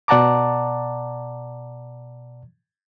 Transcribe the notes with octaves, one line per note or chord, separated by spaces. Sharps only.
B2 D5 F#5 A5 A#5 D6